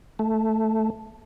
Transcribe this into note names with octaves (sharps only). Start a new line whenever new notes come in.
A3